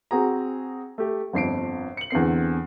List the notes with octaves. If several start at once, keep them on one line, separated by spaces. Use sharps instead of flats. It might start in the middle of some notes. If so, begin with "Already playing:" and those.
C4 F#4 G#4 A#5
A3 G4
G1 F2 C7 D7
C#7 F#7
E2 D3 C4 C7